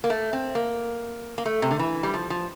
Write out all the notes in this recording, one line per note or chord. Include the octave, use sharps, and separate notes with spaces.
A#3
A3
C4
A#3
A#3
A3
C3
D3
E3
G3
F3
F3